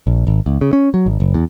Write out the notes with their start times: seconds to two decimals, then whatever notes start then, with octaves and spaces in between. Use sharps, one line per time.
0.07 A#1
0.27 G#1
0.46 C#2
0.61 C#3
0.73 C#4
0.94 F#3
1.06 G#1
1.20 F#1
1.34 E2